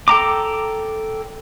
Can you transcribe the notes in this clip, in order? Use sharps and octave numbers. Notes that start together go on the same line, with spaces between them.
A4 G5 A#5 D6